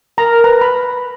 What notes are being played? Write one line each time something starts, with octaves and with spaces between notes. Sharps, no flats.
A#4 A#5
B4 A#5
B5